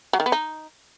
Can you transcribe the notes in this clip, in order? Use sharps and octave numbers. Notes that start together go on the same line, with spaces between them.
F#3
D#3
B3
D#4